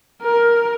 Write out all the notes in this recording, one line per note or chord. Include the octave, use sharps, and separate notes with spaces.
A#4